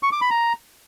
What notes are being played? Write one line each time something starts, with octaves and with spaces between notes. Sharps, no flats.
C#6
D6
B5
A#5